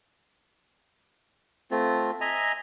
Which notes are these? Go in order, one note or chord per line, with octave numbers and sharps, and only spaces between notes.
A3 C4 F4
D#5 E5 G#5 A#5